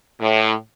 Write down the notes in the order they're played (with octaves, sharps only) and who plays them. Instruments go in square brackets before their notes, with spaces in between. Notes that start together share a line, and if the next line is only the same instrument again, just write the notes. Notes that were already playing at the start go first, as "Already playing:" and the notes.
[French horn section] A2